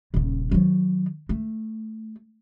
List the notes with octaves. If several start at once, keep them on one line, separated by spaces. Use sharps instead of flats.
D#1 C#3
D#3 F#3
A3